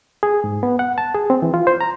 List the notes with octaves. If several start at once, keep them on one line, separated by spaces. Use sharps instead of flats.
G#4
G#2
B3
F#5
A5
G#4
C4
E3
F4
C5
A#5